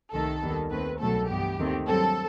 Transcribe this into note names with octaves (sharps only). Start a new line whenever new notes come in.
C2 C3 D#3 A3 A4
D#2 D#3 G3 B3
D#2 D#3 A3 C4 B4
C2 B2 F#3 A3 A4
G2 E3 B3 G4
D#2 D#3 A3 C4
G2 F#3 C4 A4